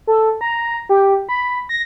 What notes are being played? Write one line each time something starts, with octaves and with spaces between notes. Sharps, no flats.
A4
A#5
G4
B5
A#6